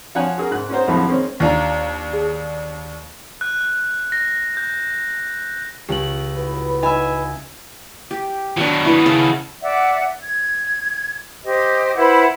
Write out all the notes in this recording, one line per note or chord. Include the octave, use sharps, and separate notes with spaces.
F3 C#5 F#5 G#5 F#6
F#4 G#4 A#4
G#2 F#6
C#4 D#4 F#4 C5
B1 F2 A2 D3 F3 G#3
D#3 G#3 C4 C#4
D#2 D4 F4 F5 A#5
G#4
F#6
F#6
A#6
G6
C#2 G4 F#7
A2 F#4 B4
D#4 D#5 E5 G#5 B5
G4
B2 D#3 F#3 D4
E4 B4 C#6
C#3 A4 F#5
D5 E5 F#5
G#6
G4 C5 D#5
E4 B4 C5 F#5